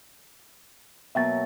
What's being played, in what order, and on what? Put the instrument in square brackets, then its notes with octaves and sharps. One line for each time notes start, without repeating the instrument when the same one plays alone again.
[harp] B2 F#3 A#3 [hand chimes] E5 G5 A6